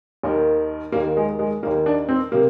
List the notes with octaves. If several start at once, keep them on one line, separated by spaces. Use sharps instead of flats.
D#2 D#3
D#2 D#3 A#3
G#3
G#3
D#2 D#3 A#3
D4
C4
C3 A#3